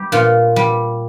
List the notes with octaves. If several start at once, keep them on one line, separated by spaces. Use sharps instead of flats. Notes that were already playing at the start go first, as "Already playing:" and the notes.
Already playing: G3 G4
A#2 F4
G3